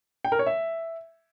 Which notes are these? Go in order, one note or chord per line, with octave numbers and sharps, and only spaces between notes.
G5
A#4
C#5
E5